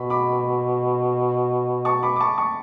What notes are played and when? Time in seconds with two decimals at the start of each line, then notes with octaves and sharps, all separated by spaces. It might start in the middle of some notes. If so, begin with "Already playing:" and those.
Already playing: B2 B5
0.10 B5 D6
1.85 A5 C#6
2.03 B5 D6
2.16 D6
2.20 A5 C#6
2.38 A5 C#6